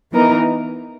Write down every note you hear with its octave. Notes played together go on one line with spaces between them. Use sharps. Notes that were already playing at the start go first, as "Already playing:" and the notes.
E3 B3 D#4 A#4